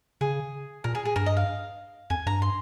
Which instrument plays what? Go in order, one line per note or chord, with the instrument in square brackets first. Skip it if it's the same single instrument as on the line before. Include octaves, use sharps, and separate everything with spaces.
[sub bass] C#3 [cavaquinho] G#4
[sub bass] A#2 [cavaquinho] A#4
[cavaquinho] G#4
G#4
[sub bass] G2 [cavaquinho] A#4
[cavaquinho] D#5
F5
[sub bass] F2 [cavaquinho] G#5
[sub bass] G2 [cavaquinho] A#5
[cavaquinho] C6